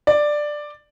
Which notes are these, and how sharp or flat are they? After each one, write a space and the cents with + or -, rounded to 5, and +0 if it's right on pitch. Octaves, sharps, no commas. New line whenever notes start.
D5 +10